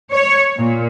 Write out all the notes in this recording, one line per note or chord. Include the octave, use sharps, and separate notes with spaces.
C#5
A#2